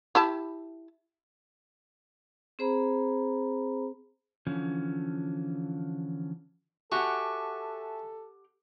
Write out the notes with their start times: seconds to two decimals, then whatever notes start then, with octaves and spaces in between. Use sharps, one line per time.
0.15 E4 G4 A5
2.59 C4 G#4 C5 A#5 B5
4.47 D3 E3 F3 C#4
6.92 F#4 G4 A4 E5 F#5 G#5 A5